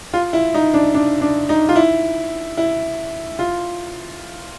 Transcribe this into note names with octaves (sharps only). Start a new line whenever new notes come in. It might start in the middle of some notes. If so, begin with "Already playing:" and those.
F4
E4
D#4
D4
D4
D4
D#4
F4
E4
E4
F4